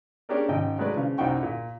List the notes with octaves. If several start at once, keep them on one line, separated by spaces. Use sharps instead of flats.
C#4 D4 G4 G#4 A#4 D5
G#1 C#3 D#5 G5
F#3 G#3 A3 B4 D5
C#3 F3
C2 F#2 D#4 F#4 G5 C#6
A#2